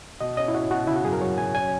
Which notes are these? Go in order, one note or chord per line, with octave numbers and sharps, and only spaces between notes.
B2 D#5
C#4 D#5
E4
C#4 F#4
B2 F#4
C#3 E4
F#4
F#2 G#4
A#4
F#3 C#5
F#2 G#5
C#4 G#5